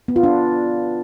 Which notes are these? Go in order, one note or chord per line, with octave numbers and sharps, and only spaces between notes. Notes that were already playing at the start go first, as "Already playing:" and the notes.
B3
F4
D4